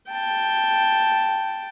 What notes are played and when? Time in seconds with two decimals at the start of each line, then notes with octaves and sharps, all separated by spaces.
0.11 G5 A5